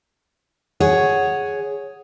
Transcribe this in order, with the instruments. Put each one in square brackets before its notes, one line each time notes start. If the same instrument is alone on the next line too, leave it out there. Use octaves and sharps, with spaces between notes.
[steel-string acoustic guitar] G#4 C#5 F#5